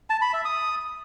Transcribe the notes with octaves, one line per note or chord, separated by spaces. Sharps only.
A5
B5
E5
D#6